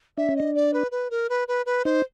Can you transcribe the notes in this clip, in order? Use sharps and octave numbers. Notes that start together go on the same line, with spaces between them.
D4 E5
C#4
D4 D#5
D5
B4
B4
A#4
B4
B4
B4
D#4 C5